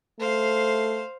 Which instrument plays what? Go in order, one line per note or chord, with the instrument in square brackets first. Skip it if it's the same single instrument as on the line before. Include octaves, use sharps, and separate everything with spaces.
[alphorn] A3 [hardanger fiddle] C5 F5